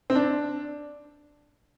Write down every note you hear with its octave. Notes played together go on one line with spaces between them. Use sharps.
C4
D4